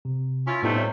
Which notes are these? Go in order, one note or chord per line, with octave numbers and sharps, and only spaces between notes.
C3
C#4 E4 F4
A2 C3 G3 A3 B3 D#4
C#5